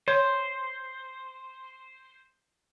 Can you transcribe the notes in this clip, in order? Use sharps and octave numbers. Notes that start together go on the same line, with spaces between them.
C5 C#5